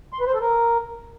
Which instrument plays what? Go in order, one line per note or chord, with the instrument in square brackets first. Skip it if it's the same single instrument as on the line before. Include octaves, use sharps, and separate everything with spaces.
[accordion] C6
B4
C5
A4
A#4